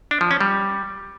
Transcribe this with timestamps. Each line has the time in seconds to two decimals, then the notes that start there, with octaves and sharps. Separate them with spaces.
0.11 D4
0.21 F3
0.31 C#4
0.41 G3